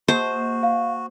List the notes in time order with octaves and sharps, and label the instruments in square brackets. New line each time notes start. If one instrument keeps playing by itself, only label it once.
[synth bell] A#3 [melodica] F#4 [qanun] C5
[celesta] F5